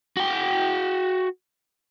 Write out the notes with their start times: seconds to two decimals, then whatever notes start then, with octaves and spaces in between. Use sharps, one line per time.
0.17 F#4 G5